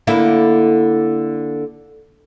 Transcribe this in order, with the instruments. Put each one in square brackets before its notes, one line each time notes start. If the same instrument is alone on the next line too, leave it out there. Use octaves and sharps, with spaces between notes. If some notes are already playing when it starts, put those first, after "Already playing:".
[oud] D3 A#3 E4